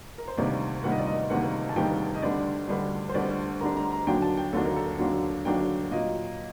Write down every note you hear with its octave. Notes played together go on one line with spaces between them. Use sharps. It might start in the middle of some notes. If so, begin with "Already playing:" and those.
A#4
C5
D2 C3 D#3 G3 A#3 D5
D2 C3 D#3 G3 A#3 F#5
D#5
D5
D#5
D2 C3 D#3 G3 A#3 F#5
A5
D2 C3 D#3 G3 A#3 G5
D#5
D2 D3 G3 D4 D5
D2 D3 G3 D4
C5
D2 D3 G3 D4 D5
D2 D3 G3 D4 A#5
A#5
A#5
D#2 D3 F#3 A#3 D4 G5
A5
G5
D#2 D3 F#3 A#3 D4 A4
A#4
A4
D#2 D3 F#3 A#3 D4
D#2 D3 F#3 A#3 D4 G5
A#2 F#3 A#3 D#5